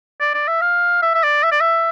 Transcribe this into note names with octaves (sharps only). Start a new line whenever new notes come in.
D5
D5
E5
F5
E5
E5
D5
E5
D5
E5